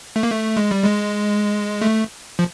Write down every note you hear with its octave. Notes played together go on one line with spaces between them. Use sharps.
A3
A#3
A3
G#3
G3
G#3
A3
F3